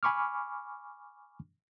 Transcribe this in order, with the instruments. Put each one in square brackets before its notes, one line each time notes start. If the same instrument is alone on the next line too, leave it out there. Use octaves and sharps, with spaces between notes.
[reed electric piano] G#5 B5 C#6 D6 F6